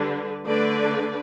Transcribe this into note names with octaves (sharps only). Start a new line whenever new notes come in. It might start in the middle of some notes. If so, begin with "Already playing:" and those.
Already playing: D3 G3 D4 B4
D3 A3 D4 B4 D5